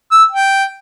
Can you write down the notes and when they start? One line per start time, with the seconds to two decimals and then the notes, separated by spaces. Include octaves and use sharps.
0.12 E6
0.31 G5